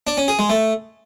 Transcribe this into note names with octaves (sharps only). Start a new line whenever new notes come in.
D4
C#4
G#4
G#3
A3